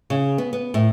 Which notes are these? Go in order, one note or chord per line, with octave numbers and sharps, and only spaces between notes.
C#3
B3
B3
A2